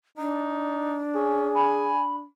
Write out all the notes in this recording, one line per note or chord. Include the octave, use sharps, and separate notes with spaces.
D4 D#4
C#4 G#4
G#5 B5